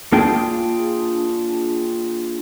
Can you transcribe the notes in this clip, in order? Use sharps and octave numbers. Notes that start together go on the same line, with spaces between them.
A#3 D4 F4 G#4 G5 A5